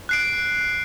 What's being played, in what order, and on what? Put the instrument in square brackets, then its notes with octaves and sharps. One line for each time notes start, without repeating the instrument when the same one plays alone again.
[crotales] F#6 C7 D7